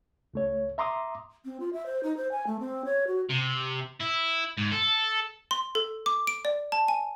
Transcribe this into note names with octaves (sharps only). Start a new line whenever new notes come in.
C#2 A3 C#5
E5 A#5 C6 D6 D#6
C4
F4
E5
C5
D#4
C5
G#5
A3
C4
C#5
F#4
C3
E4
G#2
A4
C6
A4
D6
D7
D5
A5
G#5